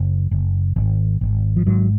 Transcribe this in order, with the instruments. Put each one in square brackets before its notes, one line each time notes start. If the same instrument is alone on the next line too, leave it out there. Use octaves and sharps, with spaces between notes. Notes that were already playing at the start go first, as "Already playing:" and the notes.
Already playing: [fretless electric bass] F#1
F#1
G#1
G#1
F3
G#2 F#3